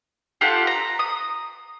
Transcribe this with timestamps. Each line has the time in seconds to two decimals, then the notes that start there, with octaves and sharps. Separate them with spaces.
0.41 F4 G4 A4 F#5
0.67 A#5
0.99 D#6